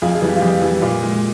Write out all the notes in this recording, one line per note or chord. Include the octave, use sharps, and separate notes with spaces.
F2 F4 G#4
F4 G#4
E3 G3
G4
F4
F2 G4
E3 G3
A#2
G#3